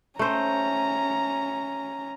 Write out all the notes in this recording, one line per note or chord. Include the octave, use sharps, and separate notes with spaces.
A3 C#4 C5 A#5